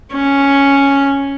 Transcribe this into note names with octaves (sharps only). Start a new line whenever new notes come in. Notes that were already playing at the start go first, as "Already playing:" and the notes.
C#4